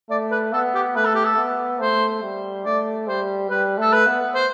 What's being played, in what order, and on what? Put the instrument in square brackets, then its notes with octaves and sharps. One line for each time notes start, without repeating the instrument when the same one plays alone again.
[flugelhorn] A3 [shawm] D5
[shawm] B4
[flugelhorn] B3 [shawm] A4
[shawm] G4
[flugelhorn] A3 [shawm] B4
[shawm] A4
G4
A4
[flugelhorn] B3
[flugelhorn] A3 [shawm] C5
[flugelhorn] G3
[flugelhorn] A3 [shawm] D5
[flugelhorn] G3 [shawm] C5
[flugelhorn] G3 [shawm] B4
[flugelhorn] A3 [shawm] A4
[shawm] B4
[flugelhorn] B3
[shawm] C5